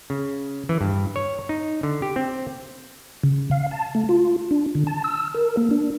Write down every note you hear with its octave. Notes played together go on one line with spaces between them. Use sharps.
C#3
E3
G2
C#5
D#4
D3
G4
C4
C#3
F5
A5
A3
F4
D4
D3
A5
E6
A#4
A#3
D4